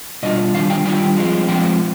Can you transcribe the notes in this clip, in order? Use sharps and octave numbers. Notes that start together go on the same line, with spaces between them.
B2 G3 D4 F4 D#5
D#3 G3 D4 F4 F5
G5
D#3 G3 D4 F4 G5
F3 G#3 C4 F4
F3 G#3 C4 F4 G5